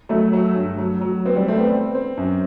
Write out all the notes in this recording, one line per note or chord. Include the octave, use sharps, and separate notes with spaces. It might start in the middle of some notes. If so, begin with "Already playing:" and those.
F#3 A3
F#3
G2
F#3
F#3
B3 C4
G3
A3 C4
B3
C4
C4
F#2